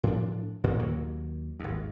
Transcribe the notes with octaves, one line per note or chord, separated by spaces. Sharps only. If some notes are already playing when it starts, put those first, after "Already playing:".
A2 F3 D4
A1 A#2 D3
D#2 D#3 F#3 A#3
G#1 D#2